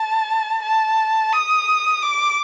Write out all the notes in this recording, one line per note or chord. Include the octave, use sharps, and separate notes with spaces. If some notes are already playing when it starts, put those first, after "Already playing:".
Already playing: A5
A5
D#6
D6